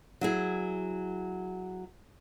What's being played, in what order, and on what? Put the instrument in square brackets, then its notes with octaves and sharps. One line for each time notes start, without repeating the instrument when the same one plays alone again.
[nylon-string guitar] F#3 E4 G#4